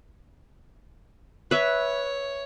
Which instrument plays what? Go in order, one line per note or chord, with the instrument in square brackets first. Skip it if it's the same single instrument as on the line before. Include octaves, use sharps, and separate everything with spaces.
[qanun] B4 E5 [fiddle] C#5